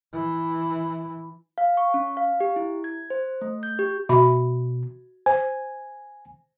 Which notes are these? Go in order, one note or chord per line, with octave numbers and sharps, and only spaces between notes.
E3
F5
C#6
C#4
F5
G4
E4
G#6
C5
A3
G6
G4
B2 F#4 E5 B5
C5 G#5